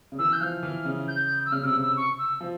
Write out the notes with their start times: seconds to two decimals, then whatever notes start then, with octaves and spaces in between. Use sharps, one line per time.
0.12 C#3
0.19 E3 E6
0.33 G6
0.41 F3 F6
0.63 E3
0.85 C#3
1.08 G6
1.46 E6
1.52 C#3 F6
1.64 C3 E6
1.74 C#3
1.82 E6
1.97 C#6
2.18 E6
2.40 F3